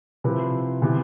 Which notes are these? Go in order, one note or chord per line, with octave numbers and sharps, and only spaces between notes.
C3 F3 C4 E4 B4
C3 E3 B3